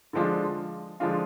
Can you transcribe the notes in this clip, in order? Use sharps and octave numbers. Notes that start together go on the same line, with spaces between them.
D3 F3 G#3 D4 F4
D3 F3 G#3 D4 F4